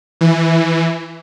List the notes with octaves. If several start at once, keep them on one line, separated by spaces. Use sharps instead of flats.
E3